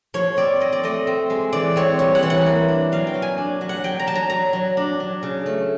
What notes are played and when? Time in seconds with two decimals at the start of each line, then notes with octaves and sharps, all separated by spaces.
0.14 F3 C#5
0.37 C4 D5
0.60 C4 D#5
0.72 D5
0.83 A3 D#5
1.07 C4
1.30 G#3
1.53 E3 D5
1.76 C4 C#5
1.99 G3 C#5
2.15 F#5
2.23 E3
2.30 F#5
2.46 A#3
2.68 D4
2.92 F#3 F5
3.07 G5
3.14 F#3
3.22 G#5
3.38 D4
3.61 F#3
3.69 F#5
3.84 F#3 G5
4.00 A#5
4.07 F#3 A5
4.15 A#5
4.30 F#3 A#5
4.53 F#3
4.77 D4
5.00 F#3
5.23 C#3
5.46 A3